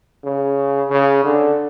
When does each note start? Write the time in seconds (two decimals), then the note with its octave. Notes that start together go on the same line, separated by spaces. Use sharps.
0.24 C#3
0.90 C#3
1.24 D3